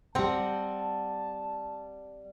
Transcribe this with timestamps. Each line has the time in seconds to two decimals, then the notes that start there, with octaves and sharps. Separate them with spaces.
0.15 G3 C4 F#5 A5 A#5